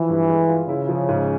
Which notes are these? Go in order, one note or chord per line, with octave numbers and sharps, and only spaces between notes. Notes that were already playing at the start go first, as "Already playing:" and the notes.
Already playing: E3 F3
G2
G#3
F4
C#3 E4
F3
G#2